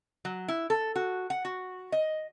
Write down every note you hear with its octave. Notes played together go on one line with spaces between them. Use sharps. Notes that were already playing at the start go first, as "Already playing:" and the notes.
F#3
E4
A4
F#4
F#5
F#4
D#5